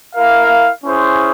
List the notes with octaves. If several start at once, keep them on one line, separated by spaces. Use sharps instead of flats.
E4 A#4 F5
C#4 E4 G#4 C5